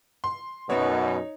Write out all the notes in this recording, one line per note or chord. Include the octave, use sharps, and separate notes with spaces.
C6
F#2 B2 B3 D#4 C#5